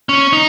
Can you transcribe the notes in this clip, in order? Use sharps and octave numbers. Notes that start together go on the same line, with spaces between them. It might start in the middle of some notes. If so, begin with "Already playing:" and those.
C#4
D#4